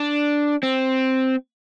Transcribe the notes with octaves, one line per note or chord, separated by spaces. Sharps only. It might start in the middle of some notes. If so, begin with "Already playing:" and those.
Already playing: D4
C4